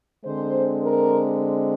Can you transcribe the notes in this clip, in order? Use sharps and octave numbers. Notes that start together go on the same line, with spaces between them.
D3 G#3 C4 C5
A#4